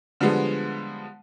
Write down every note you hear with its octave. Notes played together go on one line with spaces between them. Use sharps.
D3 F3 G3 G#3 B3